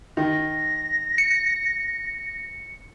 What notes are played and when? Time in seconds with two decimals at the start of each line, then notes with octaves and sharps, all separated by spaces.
0.17 D#3 A#6
1.18 C#7